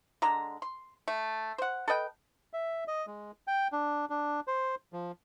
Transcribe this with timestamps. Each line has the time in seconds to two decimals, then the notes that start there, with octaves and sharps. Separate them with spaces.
0.22 D3 G#3 A#5
0.62 C6
1.08 A3
1.58 C5 F#5
1.88 A4 B4 D#5 G5
2.53 E5
2.88 D#5
3.07 G#3
3.47 G5
3.72 D4
4.10 D4
4.47 C5
4.93 F3